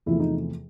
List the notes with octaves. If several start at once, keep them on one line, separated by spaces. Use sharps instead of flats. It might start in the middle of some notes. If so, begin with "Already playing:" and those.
E2 C3 F3 A3 E4
D#4